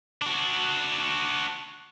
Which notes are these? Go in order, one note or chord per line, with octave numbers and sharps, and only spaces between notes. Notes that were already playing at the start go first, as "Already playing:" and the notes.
D4 F#4